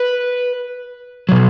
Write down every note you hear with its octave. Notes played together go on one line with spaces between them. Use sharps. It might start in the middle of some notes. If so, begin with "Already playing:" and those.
Already playing: B4
B2 F#3